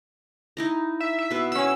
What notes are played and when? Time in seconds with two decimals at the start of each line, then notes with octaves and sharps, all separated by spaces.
0.57 D#4 E4 A#5
1.00 E5
1.19 E5
1.31 B2 B4 F#5
1.52 B3 C#4 B5 E6